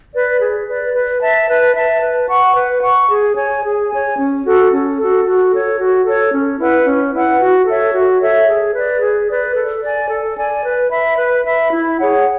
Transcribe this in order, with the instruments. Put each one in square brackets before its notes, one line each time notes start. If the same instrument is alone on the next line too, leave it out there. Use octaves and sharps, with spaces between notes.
[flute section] B4 D5
G#4
B4 D5
B4
E5 A5
B4
E5 A5
B4
F#5 C#6
B4
F#5 C#6
G#4
C#5 G#5
G#4
C#5 G#5
C#4
F#4 A4
C#4
F#4 A4
F#4
A4 C#5
F#4
A4 C#5
C#4
E4 B4 F#5
C#4
E4 B4 F#5
F#4
A4 C#5 E5
F#4
A4 C#5 E5
G#4
B4 D5
G#4
B4 D5
A4
D5 G#5
A4
D5 G#5
B4
E5 B5
B4
E5 B5
E4
G#4 C#5 F#5